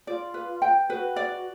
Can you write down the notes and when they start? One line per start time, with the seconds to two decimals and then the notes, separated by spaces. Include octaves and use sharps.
0.07 F4 D5
0.34 B4
0.62 G5
0.89 F#4 B4
1.16 D5